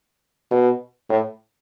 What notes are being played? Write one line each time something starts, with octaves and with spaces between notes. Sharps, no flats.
B2
A2